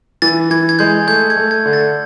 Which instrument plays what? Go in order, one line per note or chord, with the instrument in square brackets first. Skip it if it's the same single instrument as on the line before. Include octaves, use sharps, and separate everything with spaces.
[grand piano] E3 [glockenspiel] A6
[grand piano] E3 [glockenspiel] G#6
[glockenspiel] G#6
[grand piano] G#3 [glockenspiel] G6
[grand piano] A3 [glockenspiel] G6
[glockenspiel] G#6
[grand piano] A3
[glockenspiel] G#6
[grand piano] D3
[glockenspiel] A6